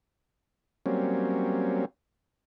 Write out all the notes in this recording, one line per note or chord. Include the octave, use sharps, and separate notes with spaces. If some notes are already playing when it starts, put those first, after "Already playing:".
F#3 G3 A#3 C4 C#4